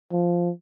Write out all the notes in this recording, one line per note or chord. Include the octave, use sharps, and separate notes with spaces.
F3